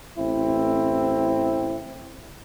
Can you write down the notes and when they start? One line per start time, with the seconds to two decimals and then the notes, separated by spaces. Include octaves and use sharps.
0.18 A1 C4 E4